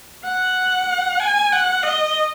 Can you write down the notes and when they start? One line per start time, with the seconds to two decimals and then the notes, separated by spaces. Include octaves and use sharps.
0.24 F#5
1.20 G#5
1.52 F#5
1.83 D#5